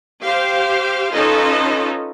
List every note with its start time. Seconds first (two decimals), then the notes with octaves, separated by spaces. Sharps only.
0.24 G4 C5 F5
1.14 C#4 D#4 F4 A4 B4 D#5